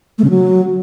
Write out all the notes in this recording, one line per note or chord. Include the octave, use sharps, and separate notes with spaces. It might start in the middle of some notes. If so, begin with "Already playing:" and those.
A3
C#3
F#3